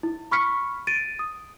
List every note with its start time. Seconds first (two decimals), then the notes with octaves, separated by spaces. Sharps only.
0.03 E4
0.31 B5 C#6 F6 B6 C#7
0.87 A6 D7 D#7
1.19 D#6